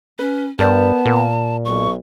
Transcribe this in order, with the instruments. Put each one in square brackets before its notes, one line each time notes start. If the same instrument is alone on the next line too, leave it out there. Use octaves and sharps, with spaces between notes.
[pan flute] C#4 [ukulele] B4
[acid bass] G2 [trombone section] B3 [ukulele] A#4 C5 D5 [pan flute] A5
[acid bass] A#2 [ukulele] A#4
[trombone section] B1 [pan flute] C#6